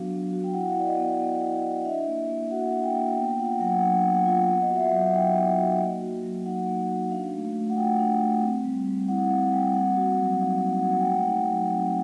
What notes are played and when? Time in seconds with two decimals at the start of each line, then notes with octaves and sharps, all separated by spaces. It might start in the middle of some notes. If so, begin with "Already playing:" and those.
Already playing: F#3 B3 D4 F#4 F5
0.10 B3
0.32 F#4
0.44 G5
0.53 E4 F#5
0.70 F5
0.76 E4 D5
0.87 D#5
0.97 B3
1.02 D#5
1.19 B3 D#5
1.42 E4
1.63 E4
1.85 D4 E5
2.07 A#3
2.29 A#3
2.51 F#4 F#5
2.73 D4
2.84 G5
2.95 A#3
3.17 B3 G5
3.39 F4 F#5
3.60 F#3 F#5
3.82 D4 F#5
4.05 B3
4.15 F#5
4.26 F4 F5
4.41 F#5
4.48 B3
4.62 D#5
4.70 F#4
4.76 E5
4.88 F#3 F5
5.01 F#5
5.14 D#4 G5
5.35 B3
5.58 F#4
5.80 A#3
6.01 F#4
6.23 F#3
6.46 D#4 F#5
6.67 A#3
6.89 F#4
7.12 D4 F5
7.34 A3
7.45 F5
7.55 A3
7.70 F#5
7.76 F4 G5
7.99 D4
8.21 A3
8.42 C4
8.64 G3
8.86 G3
9.08 E4 F#5
9.30 C4 F5
9.52 G3 G5
9.74 A#3 F#5
9.97 F#4
10.19 F#3
10.41 D#4 F5
10.62 A#3
10.73 F#5
10.84 F#4
10.99 G5
11.06 A3 F#5
11.28 D#4
11.50 F#3
11.72 C4